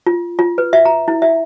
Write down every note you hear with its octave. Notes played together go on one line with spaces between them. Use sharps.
F4
F4
B4
E5
A#5
E4
E5